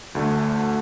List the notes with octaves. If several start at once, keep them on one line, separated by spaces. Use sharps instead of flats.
D2 D3 A3